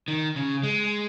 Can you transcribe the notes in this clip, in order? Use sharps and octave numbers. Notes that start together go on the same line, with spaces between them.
D#3
C#3
G#3